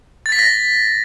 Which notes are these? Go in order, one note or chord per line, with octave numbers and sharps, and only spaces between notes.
A6
B6
A#6